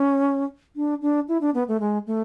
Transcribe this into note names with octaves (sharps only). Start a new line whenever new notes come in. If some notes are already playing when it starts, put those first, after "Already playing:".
Already playing: C#4
D4
D4
E4
D4
B3
A3
G#3
A3